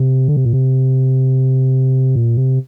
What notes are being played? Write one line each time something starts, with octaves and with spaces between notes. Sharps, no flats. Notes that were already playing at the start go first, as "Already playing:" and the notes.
Already playing: C3
D3
C3
A#2
C3
A#2
C3